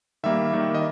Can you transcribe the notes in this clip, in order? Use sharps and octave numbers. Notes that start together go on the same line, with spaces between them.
D#3 G3 A#3 E5
D#3 G3 A#3
D#5